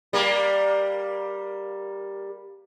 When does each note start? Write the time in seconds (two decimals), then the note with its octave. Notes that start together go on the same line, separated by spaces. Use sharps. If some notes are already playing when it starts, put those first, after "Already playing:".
0.13 G3 A#3